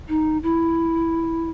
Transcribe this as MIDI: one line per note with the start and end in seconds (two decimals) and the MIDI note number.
0.09 0.38 63
0.43 1.50 64